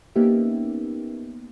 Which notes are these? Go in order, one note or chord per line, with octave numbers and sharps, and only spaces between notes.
A#3 B3 C#4 D#4 G4 E5